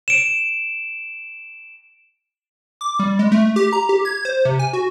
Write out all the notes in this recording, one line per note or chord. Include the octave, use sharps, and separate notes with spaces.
D7 E7
D6
G3
G#3
A3
G4
A#5
G4
G#6
C5
C3
G#5
F#4